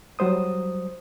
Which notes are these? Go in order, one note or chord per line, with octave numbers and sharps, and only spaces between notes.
F#3 G3 C5 D#6